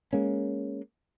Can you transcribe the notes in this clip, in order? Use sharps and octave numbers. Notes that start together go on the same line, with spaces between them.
G#3 A#3 C#4